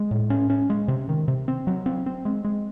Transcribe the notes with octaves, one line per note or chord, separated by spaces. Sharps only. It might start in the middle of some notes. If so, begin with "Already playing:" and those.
Already playing: G#3
A2
C#4
C#4
G#3
C3
D#3
C3
C4
F#3
C4
C4
G#3
G#3